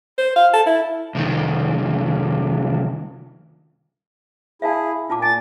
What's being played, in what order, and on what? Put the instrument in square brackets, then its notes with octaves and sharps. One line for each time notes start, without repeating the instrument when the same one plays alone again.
[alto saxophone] C5
F5
A5
E4
[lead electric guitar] C2 D#3
[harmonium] E4 G#4 [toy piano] E5 F5 A5
[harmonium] A#2 [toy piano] F4 A5 D6
[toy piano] G#5 [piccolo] A6